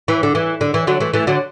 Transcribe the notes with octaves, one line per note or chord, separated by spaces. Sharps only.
E3
D3
E3
D3
E3
D3 F#3
E3 A3
E3 A3
D3 F#3